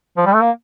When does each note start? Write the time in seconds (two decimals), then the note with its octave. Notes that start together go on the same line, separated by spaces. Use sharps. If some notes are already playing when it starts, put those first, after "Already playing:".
0.17 F3
0.26 G3
0.34 A3
0.42 A#3